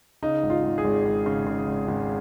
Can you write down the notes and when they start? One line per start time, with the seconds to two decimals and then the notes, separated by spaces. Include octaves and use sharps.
0.23 C#3 D#4
0.43 G#1
0.50 F4
0.64 G#1
0.78 G#4
0.84 G#1
1.05 G#1
1.26 C#3
1.46 C#3
1.67 G#1
1.88 G#1